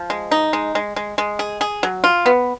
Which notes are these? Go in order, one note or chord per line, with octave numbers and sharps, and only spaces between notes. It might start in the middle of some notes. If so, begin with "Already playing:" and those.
Already playing: F3
G#3
D#4
G#3
G#3
G#3
G#3
G#4
G#4
F#3
F4
B3